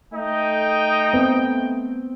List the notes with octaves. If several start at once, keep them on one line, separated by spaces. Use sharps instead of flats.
A3 D#4 D#5 G5
B3 C4